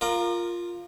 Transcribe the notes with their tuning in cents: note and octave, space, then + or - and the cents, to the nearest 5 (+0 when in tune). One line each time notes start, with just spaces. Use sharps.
F4 +0 A#4 +0 D5 +45